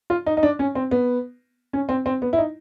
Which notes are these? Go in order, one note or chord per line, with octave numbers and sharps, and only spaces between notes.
F4
D#4
D#4
D4
C#4
C4
B3
C#4
C4
C4
B3
E4
D#4